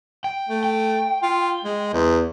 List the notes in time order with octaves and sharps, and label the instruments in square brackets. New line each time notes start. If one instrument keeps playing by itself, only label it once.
[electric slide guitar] G5
[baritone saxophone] A3
[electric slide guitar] G5
[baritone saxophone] F4
G#3
E2